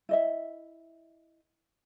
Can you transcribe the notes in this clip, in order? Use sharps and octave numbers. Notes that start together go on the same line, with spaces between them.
E4 D#5 E5